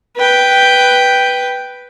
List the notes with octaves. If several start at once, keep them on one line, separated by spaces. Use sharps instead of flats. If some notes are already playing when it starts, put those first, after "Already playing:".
B4 G5